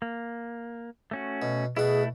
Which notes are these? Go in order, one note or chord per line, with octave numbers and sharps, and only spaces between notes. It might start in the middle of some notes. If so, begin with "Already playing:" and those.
A#3
A3 C#4 F#4
B2
B2 A3 E4 F#4 G#4